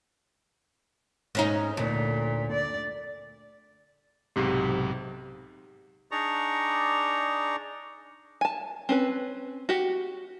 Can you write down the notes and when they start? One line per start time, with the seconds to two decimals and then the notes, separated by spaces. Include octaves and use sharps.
1.35 G#2 C#4 D#4
1.77 D2 A#2
2.52 D5
4.36 B1 G#2 C3 G4
6.12 D4 D#4 G#4 D5 A#5 C#6
8.41 G#5 A5
8.89 C4 C#4 B4
9.69 F#4 G4